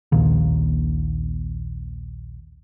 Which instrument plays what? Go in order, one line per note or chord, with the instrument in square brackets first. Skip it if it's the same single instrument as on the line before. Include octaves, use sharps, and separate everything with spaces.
[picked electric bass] A#1 D#2 A#2 D#3